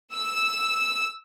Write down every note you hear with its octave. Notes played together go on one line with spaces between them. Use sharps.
E6